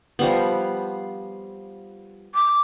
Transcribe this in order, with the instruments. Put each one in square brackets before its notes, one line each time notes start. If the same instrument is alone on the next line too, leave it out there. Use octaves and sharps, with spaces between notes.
[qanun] F3 G3 B3
[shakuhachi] D6